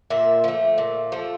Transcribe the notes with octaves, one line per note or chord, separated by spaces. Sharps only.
A#2 E5
F3 A3
A#2
F3 A3